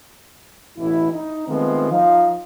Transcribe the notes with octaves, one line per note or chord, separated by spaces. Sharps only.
A1 B2 E3 E4
D#4
D#3 F3 G#3 A3 B3 C4
F3 D#4 F5